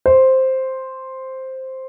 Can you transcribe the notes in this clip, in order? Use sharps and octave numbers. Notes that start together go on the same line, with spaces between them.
C5